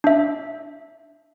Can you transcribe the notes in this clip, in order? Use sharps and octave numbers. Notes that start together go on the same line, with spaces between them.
D4 E5